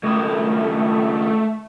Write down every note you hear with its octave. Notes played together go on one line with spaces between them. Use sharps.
C#2 D#3 A3